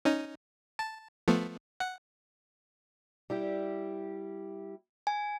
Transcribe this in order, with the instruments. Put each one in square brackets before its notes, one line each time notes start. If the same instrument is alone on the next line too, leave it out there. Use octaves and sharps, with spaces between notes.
[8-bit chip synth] C#4 D#4
A5
F3 A3 B3
F#5
[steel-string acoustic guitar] G3 E4 G4
[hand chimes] G#5